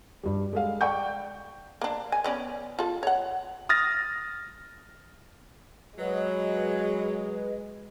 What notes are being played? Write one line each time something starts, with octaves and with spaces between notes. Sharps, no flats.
G2 G3
G#3 A4 F5
D5 G5 C#6 G6
A#3 D4
G#5
B3 C#4 D5
F4 A4
C#5 F#5
D#6 F6 A6 A#6
F#3 G#3 B4 D#5